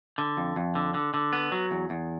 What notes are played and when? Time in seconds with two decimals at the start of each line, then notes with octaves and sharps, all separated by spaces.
0.18 D3
0.37 F2
0.56 F2
0.75 D3
0.94 D3
1.14 D3
1.33 B3
1.52 F#3
1.71 E2
1.90 E2